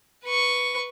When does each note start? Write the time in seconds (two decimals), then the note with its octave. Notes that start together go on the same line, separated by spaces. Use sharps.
0.24 B4 C#6